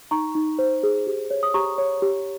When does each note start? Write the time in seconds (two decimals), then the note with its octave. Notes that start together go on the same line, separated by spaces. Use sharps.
0.11 D#4 A#5 C#6
0.35 D#4
0.59 C5
0.83 G#4
1.07 G4
1.30 C#5
1.43 D#6
1.54 G4 A#5 C#6
1.78 C#5
2.02 G4